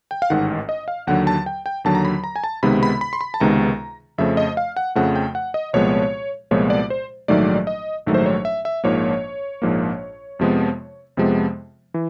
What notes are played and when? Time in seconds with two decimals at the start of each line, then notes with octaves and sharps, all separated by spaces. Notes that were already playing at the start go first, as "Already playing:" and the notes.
0.11 G5
0.22 F5
0.30 A1 G#2 D#3 F#5
0.69 D#5
0.88 F5
1.07 D#2 D3 F#3 F#5
1.27 A5
1.46 G5
1.66 G5
1.85 D#2 D3 F#3 A5
1.95 A#5
2.05 B5
2.24 A#5
2.36 G#5
2.44 A5
2.63 C#2 C3 D#3 G#3 B3 B5
2.83 B5
3.01 B5
3.13 C6
3.21 B5
3.34 A5
3.40 C#2 C3 D#3 G#3 B3 A#5
4.18 F2 C#3 F3 A3 E5
4.37 D#5
4.57 F5
4.77 F#5
4.95 F2 C#3 F3 A3 F#5
5.15 G5
5.35 F#5
5.54 D#5
5.73 C2 A#2 F3 G#3 B3 C#5
6.51 C2 A#2 F3 G#3 B3 C#5
6.70 D5
6.90 C5
7.28 A#1 G#2 D#3 F#3 A3 D5
7.67 D#5
8.06 A#1 G#2 D#3 F#3 A3
8.14 C5
8.26 C#5
8.45 E5
8.65 E5
8.84 A#1 G#2 F3 A#3 C#5
9.62 A#1 G#2 F3 A#3
10.39 F2 C3 F3 G#3 B3
11.17 F2 C3 F3 G#3 B3
11.94 E3